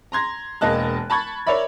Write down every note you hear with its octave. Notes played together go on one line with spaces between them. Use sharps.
A#5 C6 G#6 A#6
E1 A#3 D#5 A5 F#6
A5 B5 C#6 G#6 A6
A#4 C#5 D5 E5 B5